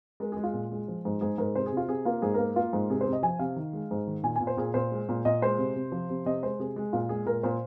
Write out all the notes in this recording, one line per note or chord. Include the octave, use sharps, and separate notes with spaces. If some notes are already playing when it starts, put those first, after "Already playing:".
G#3 A#4
G#3 G#4
F4
A#2
G#3
F3
G#2
G#2 G#4
G#2 A#4
C3 C5
G#4
C3
F4
C3 G#4
A#3 F4
G#2 G#4
A#3 A#4
A#3 F4
G#2
C3 G#4
C5
C3
D#5
F3 G#5
C3 F5
D#3
G#3
G#2
D#3
A#2 G#5
A#2 G#5
C5
A#2 G#4
A#2 C5
G#3
A#2
A#2 D#5
G#3 C5
C3
C3
F3
C3
C3 D#5
G#3 C5
C3 G#4
G#3
A#2 F4
G#3 G#4
A#2 A#4
A#2 C5